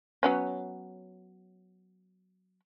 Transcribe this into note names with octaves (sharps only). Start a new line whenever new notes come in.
F#3 B3 C#4